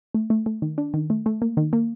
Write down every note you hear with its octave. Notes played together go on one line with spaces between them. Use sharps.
A3
A3
A3
D#3
D4
D#3
A3
A3
A#3
D#3
A#3